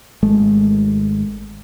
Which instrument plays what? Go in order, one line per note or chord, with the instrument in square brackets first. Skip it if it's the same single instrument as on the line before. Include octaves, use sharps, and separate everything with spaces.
[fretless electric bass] G#1 G#3 A3